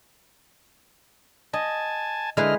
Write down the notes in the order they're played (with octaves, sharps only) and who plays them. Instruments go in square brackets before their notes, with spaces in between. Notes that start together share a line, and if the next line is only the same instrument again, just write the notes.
[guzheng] D#5 [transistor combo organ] G#5 A5
[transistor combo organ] D3 D#5 F6 [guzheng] G#3 E4 B4